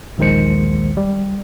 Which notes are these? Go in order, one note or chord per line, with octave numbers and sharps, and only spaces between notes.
A#1 D#2 D#3 G#3 C5 C#7
G3